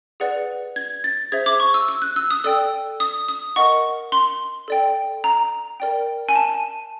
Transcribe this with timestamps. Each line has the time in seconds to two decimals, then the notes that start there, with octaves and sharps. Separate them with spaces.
0.20 G#4 B4 D5 F#5
0.76 G#6
1.04 A6
1.32 G#4 C5 E5 G#6
1.46 D6
1.60 C#6
1.74 E6
1.88 E6
2.02 F#6
2.16 E6
2.31 D#6
2.44 A4 D5 G5 E6
3.00 D#6
3.28 D#6
3.56 A#4 D#5 F#5 C#6
4.12 C6
4.68 A4 D5 G5
5.24 A#5
5.80 A#4 D5 G5
6.29 G#5
6.36 A5